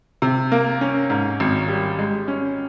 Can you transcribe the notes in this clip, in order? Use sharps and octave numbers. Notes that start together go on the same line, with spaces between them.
C3
A#3
C#4
G#2
G#1
G3
G#3
C#4